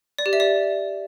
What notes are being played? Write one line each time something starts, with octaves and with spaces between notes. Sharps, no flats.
D5
G4
E5
D5